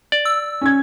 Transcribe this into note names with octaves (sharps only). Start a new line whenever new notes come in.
D5
E6
C#4 G#6